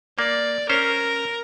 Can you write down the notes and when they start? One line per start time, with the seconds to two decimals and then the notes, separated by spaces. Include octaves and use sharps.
0.19 A#3 D5
0.70 C#4 A#4 C5